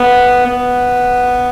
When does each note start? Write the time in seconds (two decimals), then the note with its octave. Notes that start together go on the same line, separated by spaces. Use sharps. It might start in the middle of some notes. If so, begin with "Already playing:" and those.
Already playing: B3
0.46 B3